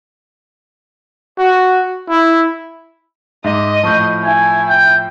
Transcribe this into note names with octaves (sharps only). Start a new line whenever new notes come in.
F#4
E4
G#2 D#5 E5 D6
A2 F3 A5 C#6 G6
E4 G#5
G5